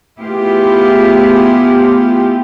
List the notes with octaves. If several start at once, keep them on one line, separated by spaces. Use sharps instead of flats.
A3 B3 E4 F4 G4 G#4